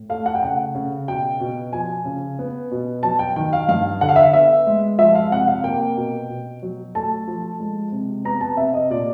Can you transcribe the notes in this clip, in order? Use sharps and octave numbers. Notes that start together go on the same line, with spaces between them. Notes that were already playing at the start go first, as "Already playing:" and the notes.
Already playing: A2
A3 F5
F#5
G5
C#3 F#5
C#3
B2 G5
B2
F3 G#5
C#3
B3
B2
F#3 A5
G5
D#3 G5
F5
G2 F5
D3 F#5
F5
E5
F5
B3 E5
G#3
F3 E5
F5
C3 F#5
F5
A#3 G5
B2
B2
F#3
A3 A5
F3
G#3
C3
B3 A#5
A5
C3 E5
D#5
A#2 D5